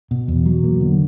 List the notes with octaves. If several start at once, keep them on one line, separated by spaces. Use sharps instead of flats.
B2
E2
F#3
A#3
D3